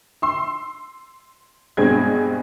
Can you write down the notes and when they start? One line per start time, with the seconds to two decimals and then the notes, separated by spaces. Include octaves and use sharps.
0.22 C6 E6
1.77 G2 B2 G#3 C4 G#6